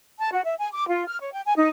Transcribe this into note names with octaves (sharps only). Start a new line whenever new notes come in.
A5
F#4
E5
G#5
D6
F4
F6
C#5
G5
G#5
D#4